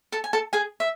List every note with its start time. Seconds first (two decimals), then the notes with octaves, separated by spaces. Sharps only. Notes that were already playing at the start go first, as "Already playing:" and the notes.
0.12 A4 A5
0.24 G#5
0.33 A4 A5
0.53 G#4 G#5
0.80 E5